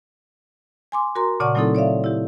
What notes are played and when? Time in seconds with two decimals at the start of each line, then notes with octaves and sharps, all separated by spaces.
0.92 G#5 C6 D6
1.15 F#4 A#4 A#5 C6
1.40 A#2 C#3 D5 F#5 A5 C#6
1.55 F#3 A3 C4 D#4 E4 A4
1.75 C#5 D5 E5 F5
2.04 E4 G4